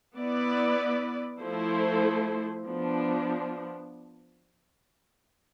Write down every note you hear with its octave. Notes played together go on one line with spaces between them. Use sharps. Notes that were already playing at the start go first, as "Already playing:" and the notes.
B3 E4 B4 D5
F3 A3 E4 A4 C5
F3 B3 D4